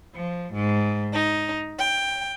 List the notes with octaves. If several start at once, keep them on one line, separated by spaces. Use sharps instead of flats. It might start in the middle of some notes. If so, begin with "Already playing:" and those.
F3
G#2
D#4
G5